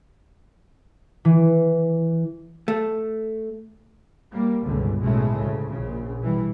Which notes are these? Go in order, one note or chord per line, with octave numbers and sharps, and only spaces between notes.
E3
A3
G3 A#3
G1 C#2 B2 D3
B1 A2 C#3 G#3 A3
D2 C#3
A#1 A#2 C#3
B2 E3 G3